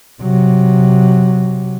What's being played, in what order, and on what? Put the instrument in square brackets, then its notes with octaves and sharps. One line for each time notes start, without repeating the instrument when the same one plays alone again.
[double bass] C3 F#3